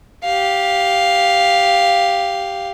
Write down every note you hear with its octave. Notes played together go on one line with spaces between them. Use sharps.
G4 F5